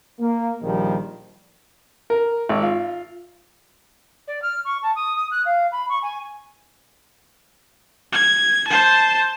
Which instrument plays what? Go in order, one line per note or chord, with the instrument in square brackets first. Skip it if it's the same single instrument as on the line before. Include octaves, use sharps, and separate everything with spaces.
[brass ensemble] A#3
A#1 D#3 F3 G3
[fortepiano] A#4
G#1
F4
[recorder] D5
F6
C#6
A5
D#6
D#6
F#6
F5
B5
C#6
G#5
[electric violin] G#6
C5 A5